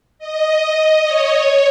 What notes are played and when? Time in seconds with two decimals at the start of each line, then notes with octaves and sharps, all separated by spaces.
0.19 D#5
1.03 C#5
1.32 C#5